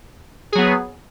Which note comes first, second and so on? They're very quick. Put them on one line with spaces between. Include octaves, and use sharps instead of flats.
G#4 F#3 B3